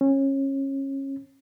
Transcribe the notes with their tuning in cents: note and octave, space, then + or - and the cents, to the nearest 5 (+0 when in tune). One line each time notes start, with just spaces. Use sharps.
C#4 -25